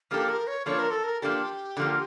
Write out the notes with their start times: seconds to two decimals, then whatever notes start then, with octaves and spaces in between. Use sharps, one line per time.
0.11 F3 A#3 D4 G4 A4
0.29 A#4
0.47 C#5
0.66 F3 A#3 D4 A4 C#5
0.79 A#4
0.91 A4
1.03 A#4
1.21 F3 A#3 D4 G4 A4
1.77 D3 F3 A#3